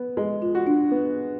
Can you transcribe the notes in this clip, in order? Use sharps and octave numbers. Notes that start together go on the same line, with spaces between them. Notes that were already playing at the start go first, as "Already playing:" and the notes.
Already playing: B3
G#3
F4
F#4
D4
B3